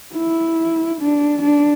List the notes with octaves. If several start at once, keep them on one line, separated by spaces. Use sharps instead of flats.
E4
D4
D4